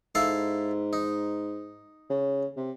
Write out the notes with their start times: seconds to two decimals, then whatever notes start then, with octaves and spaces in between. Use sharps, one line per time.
0.15 G#2 E4 A4 F5
0.93 D#4
2.10 C#3
2.57 C3